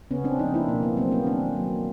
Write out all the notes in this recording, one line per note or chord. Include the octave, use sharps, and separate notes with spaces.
C#3 B3 C#4
C4 D4
F3 A#3 C#4 D#4
D4 E4
B2 A#3
B3
F#3 A3 A#3 C4
B3 C#4
D#3 C4 D4
F#3 A#3